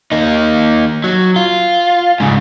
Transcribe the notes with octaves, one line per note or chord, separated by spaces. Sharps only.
A#3 D#4
F#3
F4
G#2 C#3